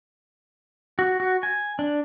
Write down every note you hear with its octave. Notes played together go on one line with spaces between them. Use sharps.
F#4
F#4
G#5
D4